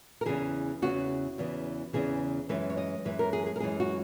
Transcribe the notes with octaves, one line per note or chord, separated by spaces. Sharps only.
A#4
E2 C#3 E3 G#4
E2 C#3 E3 F#4
E2 C#3 E3
E2 C#3 E3 G#4
F#2 E3 G#3 B4
C#5
D#5
F#2 E3 G#3 B4
A#4
G#4
G#4
A#4
F#2 E3 G#3 G#4
F#4